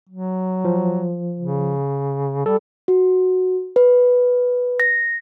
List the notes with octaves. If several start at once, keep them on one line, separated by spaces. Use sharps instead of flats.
F#3
F3
C#3
G3 A4
F#4
B4
A#6